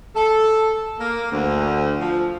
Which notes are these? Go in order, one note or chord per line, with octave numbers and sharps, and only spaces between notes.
A4
A#3
D2
F3